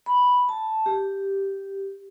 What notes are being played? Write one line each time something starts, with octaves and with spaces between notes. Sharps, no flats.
B5
A5
G4